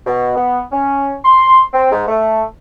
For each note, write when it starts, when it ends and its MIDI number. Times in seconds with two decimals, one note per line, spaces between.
0.06 0.33 47
0.35 0.60 59
0.71 1.14 61
1.25 1.62 84
1.73 1.89 60
1.91 2.03 44
2.08 2.42 57